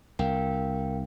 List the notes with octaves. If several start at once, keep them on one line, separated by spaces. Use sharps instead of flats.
C2 A#4 F5 G5